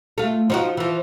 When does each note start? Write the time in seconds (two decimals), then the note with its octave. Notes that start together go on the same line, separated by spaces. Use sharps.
0.18 A3 F4
0.50 F3 D#4 F#4
0.77 E3 F3